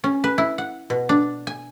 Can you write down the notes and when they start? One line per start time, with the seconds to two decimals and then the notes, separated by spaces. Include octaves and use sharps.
0.04 C#4
0.24 B4
0.38 E4
0.58 F#5
0.90 B2
1.09 D4
1.47 G#5